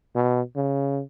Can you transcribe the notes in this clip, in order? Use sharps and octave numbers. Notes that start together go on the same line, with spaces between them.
B2
C#3